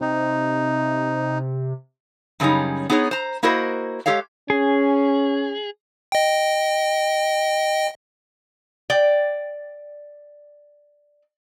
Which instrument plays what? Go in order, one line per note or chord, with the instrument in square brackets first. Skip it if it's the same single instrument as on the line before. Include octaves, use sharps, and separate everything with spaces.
[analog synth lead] C3 [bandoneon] D#4
[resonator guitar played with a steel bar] F#2 C#3 G3 C#4 D#4
B3 D#4 G#4 A4 C#5
C5 A#5
A#3 E4 F#4 A#4 C5 D#5
G#3 G4 A4 C#5 F5
[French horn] C#4 [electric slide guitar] G#4
[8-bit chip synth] D#5 G5
[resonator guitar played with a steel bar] D5 G5